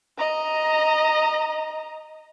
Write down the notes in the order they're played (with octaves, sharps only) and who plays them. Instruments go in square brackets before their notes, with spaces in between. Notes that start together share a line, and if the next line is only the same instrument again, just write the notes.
[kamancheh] D#5 A#5